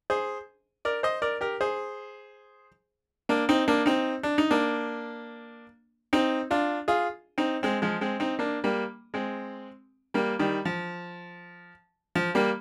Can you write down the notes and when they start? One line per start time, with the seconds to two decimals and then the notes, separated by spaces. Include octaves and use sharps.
0.10 G#4 C5
0.85 A#4 D5
1.03 C5 D#5
1.22 A#4 D5
1.41 G4 A#4
1.61 G#4 C5
3.29 A#3 D4
3.49 C4 D#4
3.68 A#3 D4
3.86 C4 D#4
4.23 D4
4.38 D#4
4.51 A#3 D4
6.13 C4 D#4
6.51 D4 F4
6.88 F4 G#4
7.38 C4 D#4
7.63 G#3 C4
7.82 F3 G#3
8.01 G#3 C4
8.20 C4 D#4
8.39 A#3 D4
8.64 G3 A#3
9.14 G#3 C4
10.14 G3 A#3
10.39 D#3 G3
10.65 F3
12.15 F3
12.35 G3 A#3